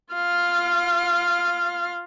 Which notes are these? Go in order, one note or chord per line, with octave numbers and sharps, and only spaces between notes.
F4 F5